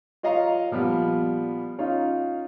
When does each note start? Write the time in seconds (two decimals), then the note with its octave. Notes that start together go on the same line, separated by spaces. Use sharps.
0.23 F4 C#5 D#5 F5 A#5
0.71 A#2 F3 G3 B3
1.79 C#4 D#4 F4